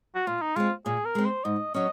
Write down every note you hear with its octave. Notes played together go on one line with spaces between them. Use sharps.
F#4
A#2 F4
D#4
G#3 C4 F4
A#2 G#4
A#4
G#3 C4
C5
G#2 D#5
F#3 C#4 D#5